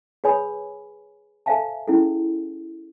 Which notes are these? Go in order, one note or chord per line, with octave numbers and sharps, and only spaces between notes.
G#4 B4 C#5 G#5 B5 D#6
A4 C5 E5 F5 G#5 A5
C#4 E4 G#4 A4